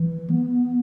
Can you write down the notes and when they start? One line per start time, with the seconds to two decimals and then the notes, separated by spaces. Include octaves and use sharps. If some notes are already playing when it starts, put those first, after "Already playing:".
Already playing: E3
0.30 B3